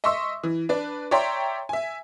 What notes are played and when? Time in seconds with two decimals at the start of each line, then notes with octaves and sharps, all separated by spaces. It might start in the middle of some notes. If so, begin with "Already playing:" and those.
0.04 D#5 E5 C6 C#6 D#6 E6
0.44 E3
0.69 D4 B4 D5
1.11 C#5 D5 E5 G5 A#5 C6
1.69 E5 G#5